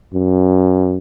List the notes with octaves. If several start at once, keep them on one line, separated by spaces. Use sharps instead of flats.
F#2